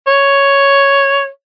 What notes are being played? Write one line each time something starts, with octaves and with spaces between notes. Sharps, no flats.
C#5